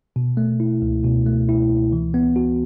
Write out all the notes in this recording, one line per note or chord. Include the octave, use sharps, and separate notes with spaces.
B2
A3
E4
C#2
B2
A3
E4
C#2
E3
B3
F#4